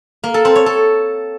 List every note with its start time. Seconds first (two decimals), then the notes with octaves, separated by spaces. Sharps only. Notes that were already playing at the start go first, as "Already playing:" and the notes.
0.24 A#3
0.34 A4
0.45 C4
0.56 C#5
0.66 A4